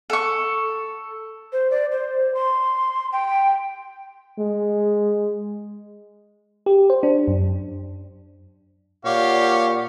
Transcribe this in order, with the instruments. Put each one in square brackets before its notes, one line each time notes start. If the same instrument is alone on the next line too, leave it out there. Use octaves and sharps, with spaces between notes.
[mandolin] A4 C#6
[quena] C5
D5
C5
C6
G5
[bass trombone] G#3
[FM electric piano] G4
C5
D4
F#2
[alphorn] A#2 [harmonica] G4 F5 [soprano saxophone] C#5 [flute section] D5 F#5